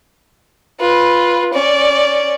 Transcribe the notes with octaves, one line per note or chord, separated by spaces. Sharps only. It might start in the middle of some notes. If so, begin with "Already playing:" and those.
F4 B4
C#4 D5